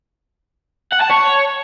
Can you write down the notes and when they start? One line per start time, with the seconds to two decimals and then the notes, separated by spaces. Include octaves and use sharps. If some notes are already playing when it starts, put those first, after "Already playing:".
0.93 F#5
1.02 A5
1.11 C#5